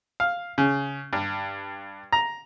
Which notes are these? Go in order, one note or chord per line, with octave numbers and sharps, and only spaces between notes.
F5
C#3
G2
A#5